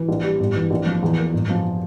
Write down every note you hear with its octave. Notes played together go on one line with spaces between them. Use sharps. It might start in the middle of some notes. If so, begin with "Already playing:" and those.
Already playing: E3
A#1
G3
G1
E3
A#1
F3
E2
A#3
G1
F3